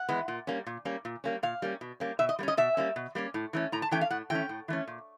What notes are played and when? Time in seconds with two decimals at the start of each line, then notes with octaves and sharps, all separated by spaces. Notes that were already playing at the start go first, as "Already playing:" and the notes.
Already playing: F#5
0.09 E3 G#3 B3
0.28 A#2
0.47 G3 A#3 C#4
0.67 A#2
0.85 G3 A#3 C#4
1.05 A#2
1.24 G3 A#3 C#4
1.43 A#2 F5
1.62 G3 A#3 C#4
1.81 B2
2.00 G3 A#3 C#4
2.19 B2 E5
2.29 D#5
2.39 G3 A#3
2.43 C#4 D#5
2.57 B2 E5
2.77 G3 A#3 C#4
2.96 B2
3.15 G3 A#3 C#4
3.34 A2
3.53 E3 A3 C#4
3.72 A2 A#5
3.82 A5
3.91 E3 A3 C#4 G5
4.01 F5
4.10 A2 F#5
4.30 E3 A3 C#4 G5
4.49 A2
4.68 E3 A3 C#4
4.88 A#2